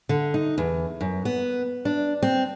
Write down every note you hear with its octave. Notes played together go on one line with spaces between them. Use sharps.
D3
D#4
E2
F#2
B3
D4
C4